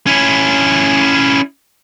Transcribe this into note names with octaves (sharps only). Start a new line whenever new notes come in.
C#4 E4